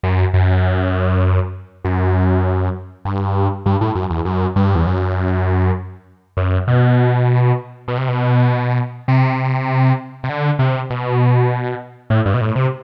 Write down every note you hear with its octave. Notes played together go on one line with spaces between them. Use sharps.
F#2
F#2
F#2
G2
G2
A2
F#2
E2
F#2
G2
E2
F#2
F#2
B2
B2
C3
B2
C3
C3
D3
C3
B2
A2
G2
B2
A2
C3